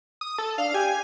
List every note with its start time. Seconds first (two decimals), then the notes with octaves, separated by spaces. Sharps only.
0.21 D#6
0.38 A4
0.58 D4 F5
0.74 G4 G#5